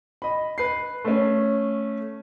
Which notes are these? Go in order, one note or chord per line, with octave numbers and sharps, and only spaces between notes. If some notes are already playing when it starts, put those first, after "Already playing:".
D#5 B5
B4 C7
A3 C#4